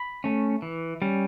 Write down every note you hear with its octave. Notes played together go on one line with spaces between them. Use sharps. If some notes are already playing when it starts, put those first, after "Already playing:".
Already playing: B5
A3 C#4
E3
G3 C#4